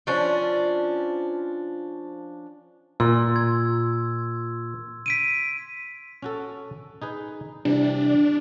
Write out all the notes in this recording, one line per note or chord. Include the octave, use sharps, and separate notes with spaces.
F3 C#4 D4
A#2 C6 E6
G#6
B6 D7 D#7
C#4 F#4 A4
D#4 G#4 B4
C3 E3 G3 D4